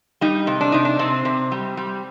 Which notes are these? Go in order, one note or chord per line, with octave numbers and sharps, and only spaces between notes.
G3 D#4
C3
D4
C3 D#4
D4
C3 C4
C3
G3
G3